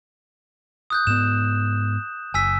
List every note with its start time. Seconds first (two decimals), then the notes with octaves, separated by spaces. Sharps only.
0.90 D#6 F#6 G6
1.07 G#2 B3 E7
2.34 F#1 G#5 E6 B6